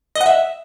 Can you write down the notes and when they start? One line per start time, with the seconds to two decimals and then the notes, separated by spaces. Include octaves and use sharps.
0.15 D#5
0.21 F#5
0.26 E5